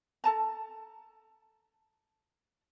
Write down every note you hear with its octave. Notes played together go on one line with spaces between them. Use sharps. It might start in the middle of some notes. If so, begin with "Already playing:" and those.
A4 A5 A#5